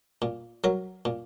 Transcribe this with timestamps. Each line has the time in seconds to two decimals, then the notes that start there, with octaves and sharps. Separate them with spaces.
0.22 A#2
0.64 F#3 A#4
1.05 A#2